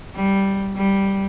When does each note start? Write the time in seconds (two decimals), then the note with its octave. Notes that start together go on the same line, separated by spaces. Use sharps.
0.16 G3
0.76 G3